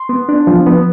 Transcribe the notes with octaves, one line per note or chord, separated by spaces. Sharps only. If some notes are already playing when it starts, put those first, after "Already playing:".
Already playing: C6
B3
D4
F3
B3